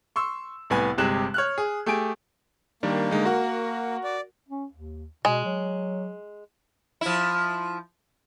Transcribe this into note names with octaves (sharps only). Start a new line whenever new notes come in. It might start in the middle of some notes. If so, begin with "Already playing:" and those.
C6 C#6 E6
C2 A2 B3 G#5
G1 C3 G#3 G4 F#6 E7
C#5 F6 F#6
G#4
A3 G4 G#4 G#5 D7
D#3 G3 A#3 D4
D3 G#3 D#4
F#4 A#4 F#5
D5
C#4
D#2
B2 G#3
F#3
F3 E4